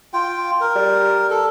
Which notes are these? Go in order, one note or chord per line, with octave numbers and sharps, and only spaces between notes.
F4 G5
A#4
G3
A4